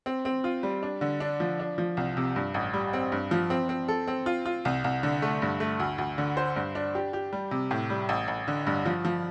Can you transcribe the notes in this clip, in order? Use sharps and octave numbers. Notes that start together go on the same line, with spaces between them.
C4
C4
F4
G3
D4
D3
D4
F3
D4
F3
C2
C3
G2
A1
G3
C4
G2
F3
C4
C4
A4
C4
F4
F4
C2
C2
D3
A3
G2
A3
D2
D2
D3
C5
G2
D4
G4
G4
G3
C3
A2
G3
A1
A1
D3
G2
F3
F3